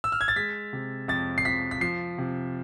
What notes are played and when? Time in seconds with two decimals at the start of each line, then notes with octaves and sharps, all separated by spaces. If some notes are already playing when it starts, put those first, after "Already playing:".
0.04 E6
0.12 F6
0.21 G#6
0.28 A6
0.36 G#3 B6
0.73 C3
1.08 F2 A6
1.38 C7
1.45 F2 B6
1.71 B6
1.81 F3 C7
2.18 C3